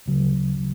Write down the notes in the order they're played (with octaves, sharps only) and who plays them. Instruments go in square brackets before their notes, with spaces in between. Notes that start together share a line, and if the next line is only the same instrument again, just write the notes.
[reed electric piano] D2 C#3 F#3